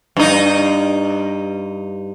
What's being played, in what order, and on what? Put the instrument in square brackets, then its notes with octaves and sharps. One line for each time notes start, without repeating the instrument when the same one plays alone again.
[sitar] G2 D#4